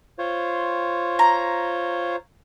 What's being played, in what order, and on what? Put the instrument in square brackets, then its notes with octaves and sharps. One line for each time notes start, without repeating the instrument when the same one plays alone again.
[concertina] F4 C5 C#5
[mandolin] A#5